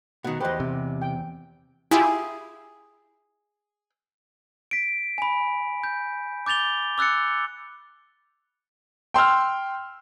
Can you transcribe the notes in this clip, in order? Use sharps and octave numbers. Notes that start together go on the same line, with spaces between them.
B2 D#3 F#5
E2 G4 B4 C5 D#5
C3
G5
E4 F4 G4 G#4
B6 D7
G#5 B5
G6
D6 G6 A6 F7 G7
D6 E6 F#6 A6 C#7
G5 C6 E6 F6